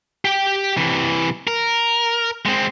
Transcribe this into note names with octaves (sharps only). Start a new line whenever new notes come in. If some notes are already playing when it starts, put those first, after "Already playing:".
G4 G5
C3 E3
A#4
G#3 C4